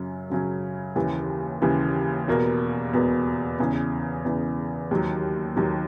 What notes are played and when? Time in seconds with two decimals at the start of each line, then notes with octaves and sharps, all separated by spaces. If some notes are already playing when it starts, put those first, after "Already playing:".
Already playing: F#2 C#3 F#3 C#4
0.30 F#2 C#3 F#3 C#4
0.96 D#2 C#3 E3
1.62 D#2 C#3 E3
2.28 E2 B2 A#3
2.93 E2 B2 A#3
3.59 E2 C#3 E3
4.25 E2 C#3 E3
4.91 D#2 D#3 F#3
5.56 D#2 D#3 F#3